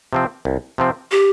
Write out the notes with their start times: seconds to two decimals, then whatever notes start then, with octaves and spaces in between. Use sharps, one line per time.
0.13 C3 F3 C4
0.45 C2
0.78 C3 F3 C4
1.11 G4